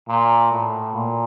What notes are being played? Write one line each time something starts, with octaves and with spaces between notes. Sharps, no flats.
A#2
A2
A#2